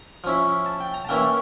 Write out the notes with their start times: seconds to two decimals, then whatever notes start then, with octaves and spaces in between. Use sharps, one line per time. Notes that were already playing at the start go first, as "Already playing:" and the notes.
Already playing: A#5
0.24 F3 C#4 E4
0.66 A5
0.81 G5
0.94 A#5
1.05 A5
1.09 E3 A#3 C#4 E4 G5